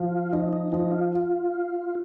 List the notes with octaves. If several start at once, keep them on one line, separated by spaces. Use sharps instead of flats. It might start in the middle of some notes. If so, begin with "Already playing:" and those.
Already playing: F3 F4
F3 D#4
D#4
F3 D#4
F4